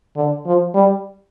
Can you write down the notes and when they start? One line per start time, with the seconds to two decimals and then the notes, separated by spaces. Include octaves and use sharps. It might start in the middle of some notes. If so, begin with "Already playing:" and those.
0.16 D3
0.45 F3
0.74 G3